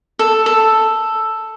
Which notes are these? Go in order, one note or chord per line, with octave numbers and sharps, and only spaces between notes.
A4
A4